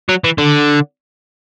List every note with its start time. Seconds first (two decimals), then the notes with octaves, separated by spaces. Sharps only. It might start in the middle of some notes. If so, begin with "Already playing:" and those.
0.09 F#3
0.24 E3
0.38 D3